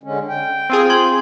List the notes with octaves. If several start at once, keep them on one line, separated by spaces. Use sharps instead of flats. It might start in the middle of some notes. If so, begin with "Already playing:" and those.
D3 G#3 C#4
G5
C4 F4 G#4
C6 G#6 F#7